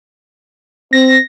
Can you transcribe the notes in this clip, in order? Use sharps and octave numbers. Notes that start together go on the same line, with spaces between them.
C4 A#6